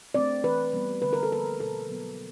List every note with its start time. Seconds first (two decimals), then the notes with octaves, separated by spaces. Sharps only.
0.14 A3 C4 D5
0.44 E3 B4
0.73 G3 B3
1.02 D3 B4
1.13 A#4
1.23 A4
1.31 F3 A#3 A#4
1.60 B2 A4
1.89 F#3 B3